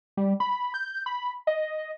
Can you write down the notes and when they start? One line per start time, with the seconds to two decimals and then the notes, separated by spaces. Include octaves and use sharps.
0.17 G3
0.40 B5
0.74 G6
1.06 B5
1.47 D#5